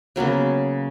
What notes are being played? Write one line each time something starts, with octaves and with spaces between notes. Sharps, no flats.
C#3 F#3 A#3 B3